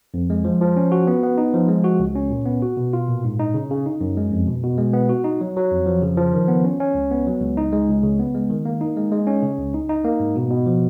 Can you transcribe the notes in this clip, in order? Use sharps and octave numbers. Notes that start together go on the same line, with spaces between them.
F2
G#3
F3
F3
C#4
F#4
B3
B3
D#4
F3
G#3
F#4
C#2
C#4
A#2
B3
F#4
B2
F4
A#2
G#2
D#4
C#3
C#3
D#4
F#2
G#3
F2
B2
B2
G#3
B3
F#4
D#4
F#3
F#3
F2
F3
C#3
F3
D#3
B3
C#4
C#4
C#2
B3
F#3
C#2
D#4
G#3
C#2
C#3
B3
G#3
D#3
A#3
D#4
G#3
G#3
C#4
C#3
C#2
D#4
D#4
A#3
G#2
B2
B2
F3